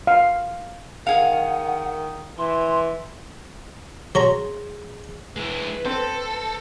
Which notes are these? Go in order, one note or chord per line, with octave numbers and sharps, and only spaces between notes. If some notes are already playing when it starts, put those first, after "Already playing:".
F5
D#3 G#4 F5 F#5
E3 C6
F#3 G#4 C#5 A#5 C6
G#3 E4 B4
C4 A4